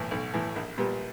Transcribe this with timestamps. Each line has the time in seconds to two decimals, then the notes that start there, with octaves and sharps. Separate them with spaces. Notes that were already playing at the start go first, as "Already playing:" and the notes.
Already playing: B1 A2 E3
0.11 B1
0.34 A2 E3
0.56 A#1
0.78 A#2 G3 B3